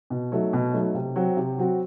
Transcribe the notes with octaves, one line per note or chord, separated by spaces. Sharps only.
B2
F#3 A3 D#4
B2
F#3 A3 D#4
C3
F#3 C4 F#4
C3
F#3 C4 F#4